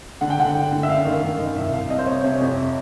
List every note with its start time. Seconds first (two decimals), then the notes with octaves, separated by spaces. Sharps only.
0.21 D3 F#5
0.30 G5
0.39 D3 F#5
0.55 D3
0.72 D3
0.83 E5
0.89 F#2 F5
1.05 D#3
1.23 D#3
1.39 D#3
1.56 C2 E5
1.73 C2 F5
1.90 C3 D#5
1.98 C5
2.06 C3 C#5
2.24 C3 C#5
2.41 F2